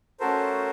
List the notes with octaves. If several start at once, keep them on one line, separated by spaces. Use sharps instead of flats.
A3 C#4 F#4 A4 A#4 C5